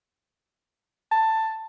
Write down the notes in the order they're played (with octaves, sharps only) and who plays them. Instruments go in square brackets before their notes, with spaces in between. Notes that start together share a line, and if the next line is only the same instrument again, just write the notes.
[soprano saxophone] A5